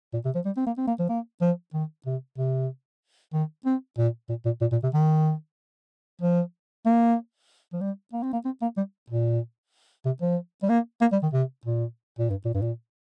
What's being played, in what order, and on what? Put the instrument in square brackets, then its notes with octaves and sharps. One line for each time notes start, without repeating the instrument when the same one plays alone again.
[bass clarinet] A#2
C3
F3
G3
C4
A#3
C4
A#3
F3
A#3
F3
D#3
C3
C3
D#3
C4
A#2
A#2
A#2
A#2
A#2
C3
D#3
F3
A#3
F3
G3
A#3
C4
A#3
C4
A#3
G3
A#2
C3
F3
G3
A#3
A#3
G3
D#3
C3
A#2
A#2
G2
A#2
G2
A#2